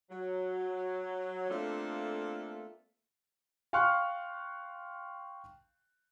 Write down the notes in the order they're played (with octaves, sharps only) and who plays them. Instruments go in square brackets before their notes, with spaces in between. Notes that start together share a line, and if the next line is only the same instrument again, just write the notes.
[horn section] F#3
A3 A#3 C4 D4 F4 A4
[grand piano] F5 G5 C6 C#6 F6 F#6